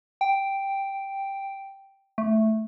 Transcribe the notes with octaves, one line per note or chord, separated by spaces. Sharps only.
G5
A3